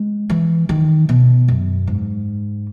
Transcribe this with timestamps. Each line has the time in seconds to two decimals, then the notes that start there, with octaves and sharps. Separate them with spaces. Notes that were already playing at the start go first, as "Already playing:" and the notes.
Already playing: G#3
0.30 E3
0.69 D#3
1.09 B2
1.48 F#2
1.87 G#2